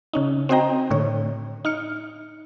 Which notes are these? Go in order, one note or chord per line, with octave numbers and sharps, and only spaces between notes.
C#3 C#4 D#4
C4 F#4 C5 D#5 G5 A#5
A2 D3 C#5
D#4 F6 C#7